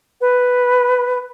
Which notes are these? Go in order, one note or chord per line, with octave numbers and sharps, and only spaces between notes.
B4